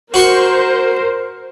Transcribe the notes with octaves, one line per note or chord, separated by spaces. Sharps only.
F#4 A#4 C5 C6 C#6